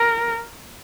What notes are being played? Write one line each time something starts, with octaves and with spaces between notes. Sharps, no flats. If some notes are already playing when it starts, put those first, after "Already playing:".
Already playing: A#4